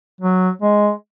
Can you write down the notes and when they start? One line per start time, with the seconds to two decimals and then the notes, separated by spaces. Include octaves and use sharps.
0.21 F#3
0.62 G#3